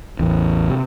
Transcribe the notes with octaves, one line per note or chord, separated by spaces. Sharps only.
A1 E2
C3